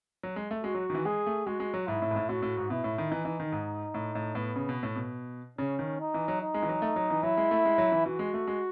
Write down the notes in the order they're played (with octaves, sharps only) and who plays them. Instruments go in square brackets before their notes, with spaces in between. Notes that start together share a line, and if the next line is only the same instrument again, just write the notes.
[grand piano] F#3
G#3
A3
[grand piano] G#3 [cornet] F#4
[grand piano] F#3
D#3
E3
[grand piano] G#3 [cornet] G#4
[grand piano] A3
[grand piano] G#3 [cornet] F#4
[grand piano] G#3
F#3
[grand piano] G#2 [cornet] E4
[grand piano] A2
G#2
A2
[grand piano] A2 [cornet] F#4
[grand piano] A2
G#2
[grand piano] B2 [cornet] E4
[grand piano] A2
D#3
[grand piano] E3 [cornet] D#4
[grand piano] E3
D#3
G#2
A2
A2
[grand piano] A2 [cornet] B3
[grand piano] C#3
B2
A2
B2
[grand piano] C#3 [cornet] C#4
[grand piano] D#3
[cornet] D#4
[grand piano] E3
F#3
[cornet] D#4
[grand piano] G#3
E3
F#3
A3
F#3
E3
[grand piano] F#3 [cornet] E4
[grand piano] G#3
A3
G#3
F#3
E3
[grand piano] E3 [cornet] F#4
[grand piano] G#3
A3
G#3